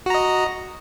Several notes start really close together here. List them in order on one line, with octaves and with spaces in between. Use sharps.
F#4 A#5 D#5